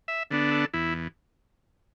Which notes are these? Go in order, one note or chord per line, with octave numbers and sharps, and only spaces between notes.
E5
D3 B3 D4
A4
E2 E4